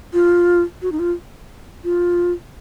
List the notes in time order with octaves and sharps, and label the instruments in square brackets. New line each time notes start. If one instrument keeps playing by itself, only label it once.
[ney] F4
F#4
D#4
F4
F4